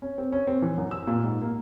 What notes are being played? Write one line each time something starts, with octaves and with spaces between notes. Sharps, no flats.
C#4
C4
C#4
C4
E3
F#2
E6
A#2
G#2
A#3